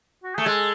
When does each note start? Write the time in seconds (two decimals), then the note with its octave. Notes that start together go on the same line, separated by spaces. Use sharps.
0.23 F#4
0.35 A3 G#4
0.46 G#3 A4